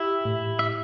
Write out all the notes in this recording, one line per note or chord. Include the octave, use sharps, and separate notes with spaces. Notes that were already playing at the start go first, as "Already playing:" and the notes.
Already playing: E4 G4 E5
A2
E5